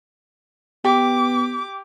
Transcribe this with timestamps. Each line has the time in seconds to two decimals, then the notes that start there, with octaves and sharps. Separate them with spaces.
0.85 B3 G4 D6